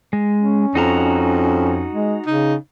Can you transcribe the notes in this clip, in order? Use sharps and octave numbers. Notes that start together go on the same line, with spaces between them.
G#3
C#4
F2 D#4 F#4 A#5
G#3
C#3 D#4